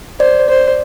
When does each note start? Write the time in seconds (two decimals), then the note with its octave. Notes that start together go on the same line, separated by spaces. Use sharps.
0.20 C5 D5
0.49 C5